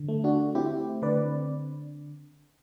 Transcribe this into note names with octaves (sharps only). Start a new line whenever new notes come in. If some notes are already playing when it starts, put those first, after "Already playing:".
Already playing: D3
A3
D4 F#4
C4 E4 G4
D3 B4 D5